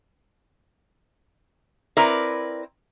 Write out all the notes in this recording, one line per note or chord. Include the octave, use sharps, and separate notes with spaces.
C4 E4 A#4 B4 D5